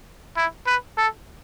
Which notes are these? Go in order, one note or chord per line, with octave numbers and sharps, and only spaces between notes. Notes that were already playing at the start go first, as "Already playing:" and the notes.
E4
B4
A4